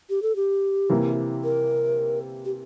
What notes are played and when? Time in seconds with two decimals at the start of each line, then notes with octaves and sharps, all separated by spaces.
0.10 G4
0.22 A4
0.36 G4
0.89 C3 E3 A#3
1.44 A#4
2.45 G4